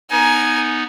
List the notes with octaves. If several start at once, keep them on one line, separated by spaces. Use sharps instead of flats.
B3 D#4 A#4 G#5